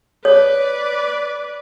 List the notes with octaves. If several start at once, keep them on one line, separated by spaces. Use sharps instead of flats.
B4 C#5 D5